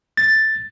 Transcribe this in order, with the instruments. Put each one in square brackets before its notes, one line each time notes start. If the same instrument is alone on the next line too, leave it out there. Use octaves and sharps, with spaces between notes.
[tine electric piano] A6